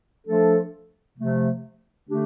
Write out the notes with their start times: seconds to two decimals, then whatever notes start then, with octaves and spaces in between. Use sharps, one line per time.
0.27 F3 A3 D4 A4
1.18 C3 F3 A3
2.08 D3 A3 D4 G4